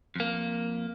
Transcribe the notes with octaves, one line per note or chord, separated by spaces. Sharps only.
F2 A#3